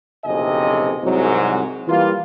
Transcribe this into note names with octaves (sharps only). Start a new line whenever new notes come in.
F#1 B1 F2 C3 D#5 G#5
C2 G#2 F#3
E3 G3 A#3 F4